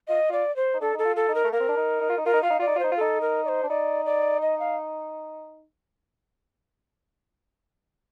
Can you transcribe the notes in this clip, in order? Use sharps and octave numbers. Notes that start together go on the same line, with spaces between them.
F4 D#5
F4 D5
C5
D#4
D4 A4
D#4 A4
F4
A4
D#4
A#4
A3
A#3 A#4
C4
D4
D#4
D#4
F4
D#4
F4 A#4
D#4
F4 F5
D#4
F4 D5
D#4
F4
D#4 C5
F4
D#4 A4
A#4
D5
C5
D4
D#4 D5
D5
D#5
F5